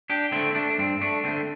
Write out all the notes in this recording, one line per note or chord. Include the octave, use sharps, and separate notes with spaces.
D4 G4
D3 A3 C4 E4
A3 D4
D4
G2 C4
A3 D4
D3 A3 C4